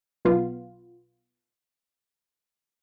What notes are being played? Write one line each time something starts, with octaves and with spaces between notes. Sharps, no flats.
B1 B3 F4